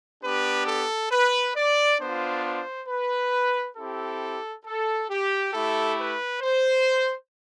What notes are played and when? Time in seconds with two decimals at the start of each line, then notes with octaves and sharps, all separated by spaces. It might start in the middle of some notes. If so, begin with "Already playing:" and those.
0.23 B3 D4 G4 B4
0.67 A4
1.11 B4
1.56 D5
2.00 B3 D4 F4 C5
2.44 C5
2.88 B4
3.77 C4 E4 G4 A4
4.65 A4
5.10 G4
5.53 A3 E4 G4 A4
5.99 B4
6.42 C5